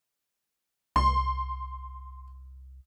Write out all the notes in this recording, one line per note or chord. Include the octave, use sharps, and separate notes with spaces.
C2 C6